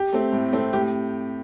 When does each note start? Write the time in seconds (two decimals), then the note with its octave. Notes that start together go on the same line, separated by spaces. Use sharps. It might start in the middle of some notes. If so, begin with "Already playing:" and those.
Already playing: G4
0.13 A3 C4
0.33 A2
0.52 A3 C4
0.73 A2 G4